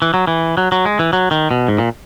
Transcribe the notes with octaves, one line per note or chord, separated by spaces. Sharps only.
E3
F#3
E3
F#3
F#3
G#3
E3
F#3
D#3
B2
G#2
A#2